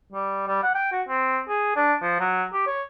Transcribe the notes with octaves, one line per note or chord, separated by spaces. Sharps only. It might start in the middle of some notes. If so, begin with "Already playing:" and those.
G3
G3
F#5
G5
F#4
C4
G#4
D4
F3
F#3
G4
C#5